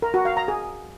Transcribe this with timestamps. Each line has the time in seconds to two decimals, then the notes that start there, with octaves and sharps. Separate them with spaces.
0.02 A#4
0.14 F#4
0.25 F5
0.37 A#5
0.48 G#4